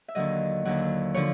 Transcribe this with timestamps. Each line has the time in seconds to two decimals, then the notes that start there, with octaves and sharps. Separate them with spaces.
0.08 E5
0.15 D#2 D3 F#3 D#5
0.65 D#2 D3 F#3
1.14 D3 F3 C#5